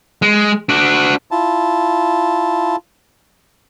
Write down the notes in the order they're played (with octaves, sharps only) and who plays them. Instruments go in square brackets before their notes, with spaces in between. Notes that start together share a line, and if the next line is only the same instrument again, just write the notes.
[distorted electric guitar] G#3
D4 F#4
[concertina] E4 F4 A5